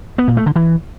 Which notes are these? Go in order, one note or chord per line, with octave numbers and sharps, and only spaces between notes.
B3
A#2
A3
D3
E3